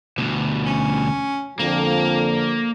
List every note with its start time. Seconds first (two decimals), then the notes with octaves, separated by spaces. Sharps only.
0.18 D2 B2
0.66 C#4
1.59 F2 D3 F3 A#3